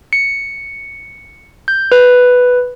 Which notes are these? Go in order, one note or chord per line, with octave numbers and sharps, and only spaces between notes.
C#7
G6
B4